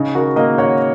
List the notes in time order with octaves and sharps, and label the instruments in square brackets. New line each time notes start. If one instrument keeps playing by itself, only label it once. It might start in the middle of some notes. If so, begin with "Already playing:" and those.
Already playing: [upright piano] C#3 D#4
F#4 A#4
A#3 A#4 D#5
C#5 F#5